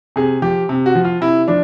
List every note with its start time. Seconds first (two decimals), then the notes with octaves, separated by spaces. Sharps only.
0.16 C3 G#4
0.42 F3 G4
0.69 C3
0.86 F#4
0.95 F3
1.05 F4
1.21 C3 E4
1.48 F3 D4